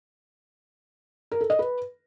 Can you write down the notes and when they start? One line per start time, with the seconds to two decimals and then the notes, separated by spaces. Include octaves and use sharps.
1.31 A#4
1.41 A4
1.50 D#5
1.59 B4